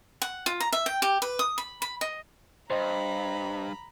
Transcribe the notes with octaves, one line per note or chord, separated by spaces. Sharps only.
F#5
F4
A#5
E5
G5
G4
B4
D#6
B5
B5
D#5
G2 C5 D#5 A#5 B5